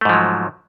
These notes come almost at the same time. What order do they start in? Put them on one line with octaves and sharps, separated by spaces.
A3 G#2 F3 F#3